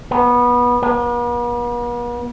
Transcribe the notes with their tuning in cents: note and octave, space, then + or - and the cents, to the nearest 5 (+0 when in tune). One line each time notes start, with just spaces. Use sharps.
B3 -20
B3 -45